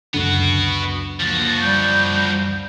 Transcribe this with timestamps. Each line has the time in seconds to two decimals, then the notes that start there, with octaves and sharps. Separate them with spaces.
0.14 C#2 F#2 D3 B3 F#4
1.20 F3 A#3 F#4 A6
1.61 G3 G6